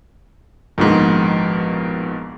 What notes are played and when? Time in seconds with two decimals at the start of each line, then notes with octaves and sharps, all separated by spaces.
0.78 A#1 G#2 B2 D#3 B4